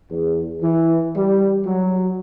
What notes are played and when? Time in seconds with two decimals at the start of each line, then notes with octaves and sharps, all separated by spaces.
0.10 E2
0.62 E3
1.16 G3
1.65 F#3